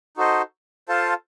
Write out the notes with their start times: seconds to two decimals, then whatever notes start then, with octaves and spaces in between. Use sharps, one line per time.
0.17 D#4 F#4 A4 C5 D#5
0.88 F4 A4 C5 F5 A5